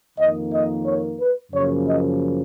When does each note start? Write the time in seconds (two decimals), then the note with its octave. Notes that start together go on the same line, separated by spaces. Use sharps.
0.18 F2 D#3 A#3 D#5
0.52 D#5
0.85 C#5
1.18 B4
1.52 F#2 C#3 F3 A#3 C#5
1.86 D#5